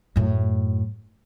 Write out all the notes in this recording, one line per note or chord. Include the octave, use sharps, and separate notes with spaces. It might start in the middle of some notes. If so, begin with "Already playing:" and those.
F#2 A2